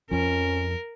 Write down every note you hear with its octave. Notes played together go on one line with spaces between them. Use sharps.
F2 F3 C#4 A#4